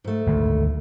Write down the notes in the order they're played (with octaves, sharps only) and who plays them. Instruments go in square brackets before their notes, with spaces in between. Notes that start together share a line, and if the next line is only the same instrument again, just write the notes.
[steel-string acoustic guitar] G#2 A3
[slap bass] G#1 D2